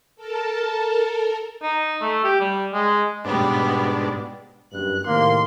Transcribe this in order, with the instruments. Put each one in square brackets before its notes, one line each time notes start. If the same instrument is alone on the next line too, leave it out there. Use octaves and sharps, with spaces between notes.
[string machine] A4 A#4 A5
[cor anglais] D#4
A3
G4
G3
G#3
[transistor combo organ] G#2 D4 [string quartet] B2 G3 B3
[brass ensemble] F#1 G2 [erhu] F#6
[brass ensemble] A2 C3 D#3 [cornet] A#3 [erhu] C6